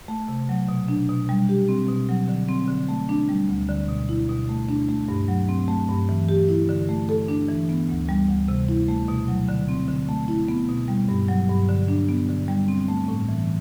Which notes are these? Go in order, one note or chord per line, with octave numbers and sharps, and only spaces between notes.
A3
C3
F#3
B2
D4
B2
G3
G4
C4
B2
F#3
D3
C4
D3
A3
D4
G3
D2
D3
B2
E4
B2
A3
D4
A3
G2
F#3
C4
A3
G2
E3
G4
E4
D3
A3
A4
D4
E3
B3
D2
G3
D2
C3
E4
A3
B2
F#3
D3
C4
D3
A3
E4
B3
B2
G3
G2
F#3
G2
D3
D4
B3
D3
G3
C4
A3
A2
E3